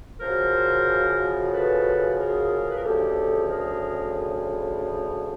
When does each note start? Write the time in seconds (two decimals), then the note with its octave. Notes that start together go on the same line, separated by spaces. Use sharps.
0.20 F#2 C#3 F3 A#4 C5
1.51 A4 B4
2.17 G#4 A#4
2.67 B4
2.75 A#4
2.83 D2 C#3 F3 G4 A4
3.48 G#4 A#4